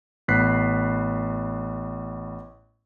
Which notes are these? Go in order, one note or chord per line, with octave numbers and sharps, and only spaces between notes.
A1 B3 B5 F#6 B6 C7